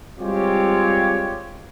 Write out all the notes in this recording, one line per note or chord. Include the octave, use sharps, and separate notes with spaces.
G3 G#3 C4 F4 G4 C#5